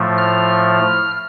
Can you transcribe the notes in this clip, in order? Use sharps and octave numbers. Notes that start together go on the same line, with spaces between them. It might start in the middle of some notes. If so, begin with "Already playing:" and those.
Already playing: A2 F3 A3
F6